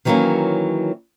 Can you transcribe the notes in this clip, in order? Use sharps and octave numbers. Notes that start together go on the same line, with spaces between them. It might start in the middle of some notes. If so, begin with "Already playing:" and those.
D#3 E3 F#3 G3 A#3 C#4